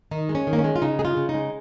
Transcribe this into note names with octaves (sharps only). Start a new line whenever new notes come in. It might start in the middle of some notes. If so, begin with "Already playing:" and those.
D#3 D#4
G#3
C#4
D#3
A#3
C#4
G#3
F4
C#3 D#4
G#3 G#4
F4
C#3
D#4
G#3